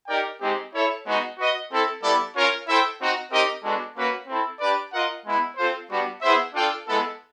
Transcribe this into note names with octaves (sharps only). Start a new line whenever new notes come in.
D#4 G4 A#4 D5 G5
G#3 C4 D#4 G4
E4 A4 C#5 E5
G#3 B3 D#4 F#4
F#4 B4 D#5
C4 E4 A4
G3 B3 E4 A4 D5
C#4 F4 A#4 C#5
E4 A4 C5 E5 G5
C4 D#4 F#4
C4 D#4 G4 A#4 D#5
G#3 B3 D4 F#4 A4
A#3 C#4 F#4 B4
C4 E4 A4
D4 G4 B4 D5
F4 A#4 D#5 F#5
G#3 B3 E4
C4 F4 A4 C5
G3 B3 D4 F#4
B3 E4 G#4 C5 E5
D4 F4 A4 D5 G5
G#3 B3 E4 A4